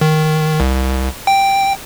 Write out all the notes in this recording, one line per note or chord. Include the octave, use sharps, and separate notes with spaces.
D#3
C2
G5